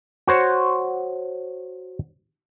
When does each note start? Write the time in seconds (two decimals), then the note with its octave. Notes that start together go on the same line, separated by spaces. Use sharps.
0.27 F#4 C5 C#5